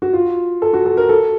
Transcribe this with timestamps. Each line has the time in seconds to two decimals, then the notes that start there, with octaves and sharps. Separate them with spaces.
0.02 F#4
0.13 F4
0.62 A4
0.73 F#4
0.86 A4
0.97 A#4
1.09 A4